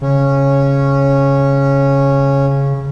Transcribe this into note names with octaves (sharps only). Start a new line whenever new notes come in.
C#3 C#4